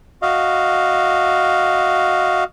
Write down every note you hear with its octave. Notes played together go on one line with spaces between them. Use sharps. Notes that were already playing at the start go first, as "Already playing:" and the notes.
F#4 D#5 F5